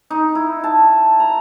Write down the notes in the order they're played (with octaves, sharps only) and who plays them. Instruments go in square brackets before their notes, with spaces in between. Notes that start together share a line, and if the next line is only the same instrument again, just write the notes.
[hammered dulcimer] D#4
E4
A5
A#5